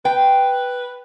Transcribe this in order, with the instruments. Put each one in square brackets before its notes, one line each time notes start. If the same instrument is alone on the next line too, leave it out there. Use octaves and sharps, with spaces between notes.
[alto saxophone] B4 [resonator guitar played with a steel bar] G5